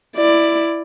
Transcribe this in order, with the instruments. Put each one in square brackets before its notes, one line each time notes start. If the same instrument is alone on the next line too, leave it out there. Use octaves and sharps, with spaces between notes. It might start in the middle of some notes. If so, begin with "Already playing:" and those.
[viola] E4 D5